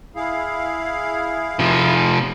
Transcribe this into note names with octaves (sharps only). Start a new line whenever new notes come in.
E4 G#4 F5
C3 F3